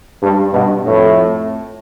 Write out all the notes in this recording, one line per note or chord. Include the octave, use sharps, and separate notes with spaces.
G2
G2 B2
F2 A2